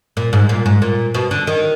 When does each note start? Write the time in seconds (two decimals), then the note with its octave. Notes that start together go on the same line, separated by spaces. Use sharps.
0.17 A#2
0.33 G#2
0.49 A#2
0.66 G#2
0.82 A#2
1.14 B2
1.31 D3
1.47 D#3